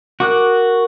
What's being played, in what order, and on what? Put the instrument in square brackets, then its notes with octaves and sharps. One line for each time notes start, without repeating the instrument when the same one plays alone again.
[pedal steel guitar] F#4 D6 F#6 [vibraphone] A#4